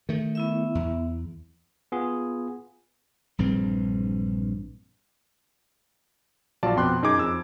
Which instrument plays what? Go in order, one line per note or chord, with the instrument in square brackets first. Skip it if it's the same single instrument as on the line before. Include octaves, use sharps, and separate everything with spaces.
[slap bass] D#3 A3
[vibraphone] B3 E4 E5
[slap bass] E2
[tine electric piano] B3 F4 G#4
[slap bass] A#1 G2 E3 C4
[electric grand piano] A#1 F#3 F4 D5 A5
F2 B2 G5 C6 D6 F#6
F#2 D#4 G#4 D6 G#6
F2 E6